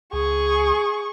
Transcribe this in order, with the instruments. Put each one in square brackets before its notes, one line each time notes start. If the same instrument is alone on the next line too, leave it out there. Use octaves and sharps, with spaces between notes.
[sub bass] C#2 [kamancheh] G#4 C#6